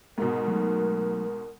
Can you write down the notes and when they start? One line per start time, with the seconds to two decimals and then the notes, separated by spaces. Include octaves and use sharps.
0.18 G#2 B2 A#4
0.48 F#3 A3 D#4